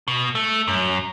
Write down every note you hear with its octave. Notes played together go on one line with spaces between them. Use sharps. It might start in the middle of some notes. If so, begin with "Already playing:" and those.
B2
A3
F#2